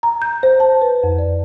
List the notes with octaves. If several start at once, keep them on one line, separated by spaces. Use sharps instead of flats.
A#5
G6
C5
A5
B4
F2
D5